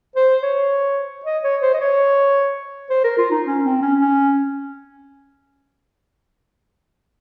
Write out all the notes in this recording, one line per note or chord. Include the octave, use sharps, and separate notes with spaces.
C5
C#5
D#5
C#5
C5
D#5
C#5
C5
A#4
F4
D#4
C#4
C4
C#4
C#4